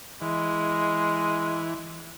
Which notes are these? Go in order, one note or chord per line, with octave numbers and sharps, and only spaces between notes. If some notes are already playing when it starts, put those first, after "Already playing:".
E3 G#3